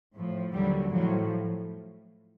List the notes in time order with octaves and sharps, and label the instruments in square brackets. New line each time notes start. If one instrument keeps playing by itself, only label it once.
[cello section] A2 F3
D#2 D3 F#3 G3
A2 F3 F#3